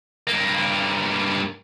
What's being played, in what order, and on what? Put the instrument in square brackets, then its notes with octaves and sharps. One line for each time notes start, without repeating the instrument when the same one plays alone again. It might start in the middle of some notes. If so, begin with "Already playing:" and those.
[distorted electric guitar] G2 A#3